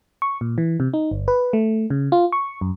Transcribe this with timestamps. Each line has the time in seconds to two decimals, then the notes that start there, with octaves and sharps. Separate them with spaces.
0.22 C#6
0.41 A#2
0.58 E3
0.80 C3
0.94 D#4
1.11 G1
1.28 B4
1.53 A3
1.90 C#3
2.12 F4
2.32 C#6
2.61 F#2